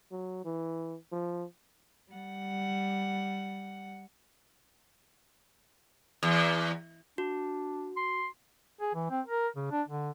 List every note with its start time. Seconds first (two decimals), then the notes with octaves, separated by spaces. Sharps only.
0.11 F#3
0.45 E3
1.12 F3
2.12 G3 F#5
6.23 E2
7.18 D4 F#4
7.96 C6
8.81 G#4
8.94 E3
9.10 C4
9.27 A#4
9.56 C#3
9.72 D4
9.88 D3